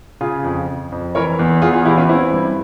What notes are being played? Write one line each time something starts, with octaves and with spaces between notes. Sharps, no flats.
C#3 F4 G#4
F2
F2
F2
E3 A#4 C#5
E2
E2 F4 G#4
F4 G#4
E3 E4 G4
C#4 F4
E3 C4 E4
G2